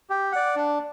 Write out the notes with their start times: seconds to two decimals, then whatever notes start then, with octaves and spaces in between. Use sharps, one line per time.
0.10 G4
0.32 D5 F#5
0.56 D4